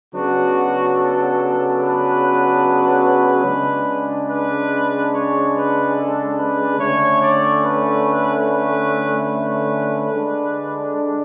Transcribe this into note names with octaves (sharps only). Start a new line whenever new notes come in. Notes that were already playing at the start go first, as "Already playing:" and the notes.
C#3 F#3 B3 D4 F#4
A4
B4
C#3 G#3 D4
B4
C#5
B4
A4
B4
D3 A3 C#4 C#5
D5
B4
B4
B4
D3 G#3 D4